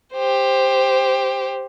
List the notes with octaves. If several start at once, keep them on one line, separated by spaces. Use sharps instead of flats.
G4 C5